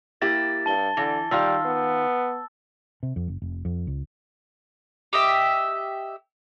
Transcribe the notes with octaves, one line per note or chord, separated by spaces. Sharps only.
A#3 E4 G4 A6
G2 A5 G7
D3 E3
D#3 G3 F4 F5 E6
B3
C3
F2
F#1
F1
F2
C#2
G4 D#5 E5